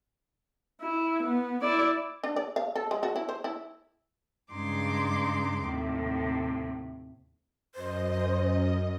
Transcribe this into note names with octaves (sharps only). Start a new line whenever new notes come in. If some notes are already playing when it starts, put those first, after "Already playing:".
E4
B3
E4 D5
D4
D5
F5
A4
G#3
F#4
E4
C5
E4
G2 C#3 G#3 D#4 C6 D6
D#2 A2 C3
F#2 C5 D#5